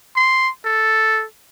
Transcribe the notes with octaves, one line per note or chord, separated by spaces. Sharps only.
C6
A4